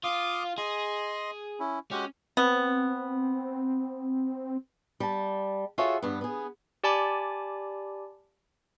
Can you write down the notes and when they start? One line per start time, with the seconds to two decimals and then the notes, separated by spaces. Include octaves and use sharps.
0.04 F4 F5 D6 D#6
0.58 G#4 D#5 C6
1.60 C#4 E4
1.91 G#3 C#4 F#4 G4
2.37 B3 C4
5.00 G3 A5
5.78 F4 F#4 G#4 A4 C#5 E5
6.02 G2 B3
6.21 B3 G#4
6.84 G4 D5 G#5 A5 B5 D6